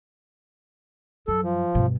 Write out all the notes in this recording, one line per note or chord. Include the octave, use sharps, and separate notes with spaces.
F#2 A4
F3
G2 B2